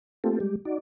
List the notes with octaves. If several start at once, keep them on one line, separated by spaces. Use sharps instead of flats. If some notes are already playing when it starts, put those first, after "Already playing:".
A3 A#3 C4 F4 G4 A4
G3 G#3 G4
D#4 F#4 D5